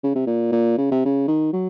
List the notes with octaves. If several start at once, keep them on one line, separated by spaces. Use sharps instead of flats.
C#3
C3
A#2
A#2
C#3
C3
C#3
D#3
F#3